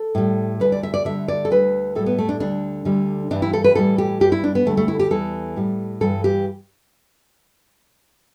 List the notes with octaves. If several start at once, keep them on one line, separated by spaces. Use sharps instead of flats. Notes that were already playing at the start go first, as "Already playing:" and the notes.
Already playing: A4
A2 G3
D2 D3 G3 B4
D5
E5
D5
D2 D3 G3 E5
D5
A4
D2 D3 G3 B4
A2 G3 A4
B3
A3
D4
D2 D3 G3 D4
D2 D3 G3
G2 E3 G3 D4
E4
A4
B4
A2 E3 G3 A4
G4
G2 G3 G4
E4
D4
B3
D2 D3 G3 A3
A3
E4
G4
E2 E3 G3 A4
A2 G3
G2 E3 G3 A4
G4